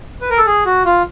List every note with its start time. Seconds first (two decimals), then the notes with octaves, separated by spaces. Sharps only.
0.21 B4
0.30 A#4
0.38 A4
0.46 G#4
0.66 F#4
0.85 F4